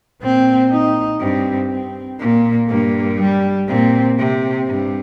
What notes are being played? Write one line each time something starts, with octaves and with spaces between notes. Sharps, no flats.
A#2 C4
D#4
G2 C4
C4
A#2 A#3
G2 A#3
G3
A#2 C4
C3 C4
G2